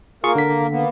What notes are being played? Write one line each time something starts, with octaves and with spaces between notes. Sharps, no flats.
A#3 F4 G#4 A#4 C#6
D3 B6
A#3 B3